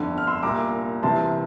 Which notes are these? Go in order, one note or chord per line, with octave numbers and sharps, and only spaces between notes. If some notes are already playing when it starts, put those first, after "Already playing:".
Already playing: G1 F2 D3
F6
C6 E6
C2 A#2 A#5 D6
C2 C3 E3 A5 C6